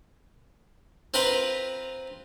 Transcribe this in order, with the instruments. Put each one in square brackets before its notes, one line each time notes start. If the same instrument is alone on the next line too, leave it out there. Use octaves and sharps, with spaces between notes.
[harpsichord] C4 F4 A#4 B4 F5 B5